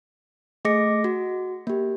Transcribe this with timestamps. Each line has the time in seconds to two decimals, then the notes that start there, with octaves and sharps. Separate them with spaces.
0.65 A3 G#4 D#5 D6 A#6 C#7
1.04 F#4
1.67 A#3 G4